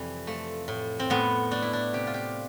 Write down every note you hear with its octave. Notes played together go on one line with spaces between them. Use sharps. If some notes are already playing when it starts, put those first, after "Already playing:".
Already playing: F2 C3 E3 G3
F3 A3
A2
C4
A2 B3
A3 D4
E4
D4
C3 G4
F4
G4